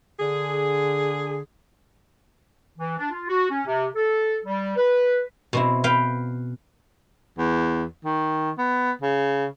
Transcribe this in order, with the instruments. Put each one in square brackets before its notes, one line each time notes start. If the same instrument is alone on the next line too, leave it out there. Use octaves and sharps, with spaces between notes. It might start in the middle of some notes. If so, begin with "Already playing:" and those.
[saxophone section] D3 G#4
[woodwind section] E3
D4
F4
F#4
C#4
C3
A4
G3
B4
[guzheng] B2 C4 E4
B4 F5 G5
[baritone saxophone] E2
D#3
B3
C#3